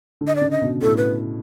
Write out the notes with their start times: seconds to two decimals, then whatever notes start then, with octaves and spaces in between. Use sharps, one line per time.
0.21 D3
0.27 D#5
0.36 D5
0.41 C#3
0.51 D#5
0.62 B2
0.82 A2 A4
0.97 B4